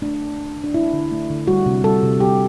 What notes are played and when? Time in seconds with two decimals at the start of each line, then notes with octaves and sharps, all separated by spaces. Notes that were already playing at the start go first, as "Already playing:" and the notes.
0.02 A3 D4
0.20 D3
0.39 A3
0.57 D3
0.64 D4
0.74 A3 E4
0.93 D3
1.11 A3
1.30 D3
1.47 G3 F#4
1.66 C3
1.84 G3 A4
2.03 C3
2.20 G3 G4